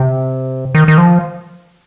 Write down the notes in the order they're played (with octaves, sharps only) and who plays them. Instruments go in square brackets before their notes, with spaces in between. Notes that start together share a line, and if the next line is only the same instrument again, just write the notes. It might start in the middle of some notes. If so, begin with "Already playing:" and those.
Already playing: [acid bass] C3
D#3
D#3
F3